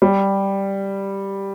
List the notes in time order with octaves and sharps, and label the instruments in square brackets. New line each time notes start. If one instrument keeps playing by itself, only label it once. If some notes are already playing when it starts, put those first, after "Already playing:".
[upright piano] G3